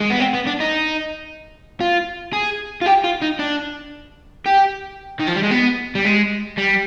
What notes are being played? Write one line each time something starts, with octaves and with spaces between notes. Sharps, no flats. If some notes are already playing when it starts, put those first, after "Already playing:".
G#3
B3
C4
B3
D4
D#4
F4
G#4
F4
G4
F4
D#4
D4
G4
D#3
F3
G3
G#3
B3
G3
G#3
G3